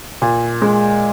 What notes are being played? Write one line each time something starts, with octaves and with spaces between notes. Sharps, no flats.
A#2
G#3